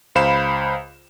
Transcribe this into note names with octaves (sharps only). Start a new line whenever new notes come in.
C#2 C5 F5 B5 E7